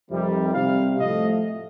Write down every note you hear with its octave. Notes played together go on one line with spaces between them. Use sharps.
F2 C3 D#3 G3
C3 G3 F5
A2 F3 A3 D#5